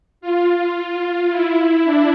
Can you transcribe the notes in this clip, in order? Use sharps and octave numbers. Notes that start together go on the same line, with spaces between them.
F4
E4
D4